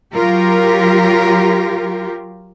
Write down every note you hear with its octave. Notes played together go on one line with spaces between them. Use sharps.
F#3 F4 G4 A#4